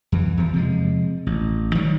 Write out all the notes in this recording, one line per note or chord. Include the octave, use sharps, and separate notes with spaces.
F2 E3
E2 F3
C3 F3 G#3
A1
D#3 E3 F#3 G3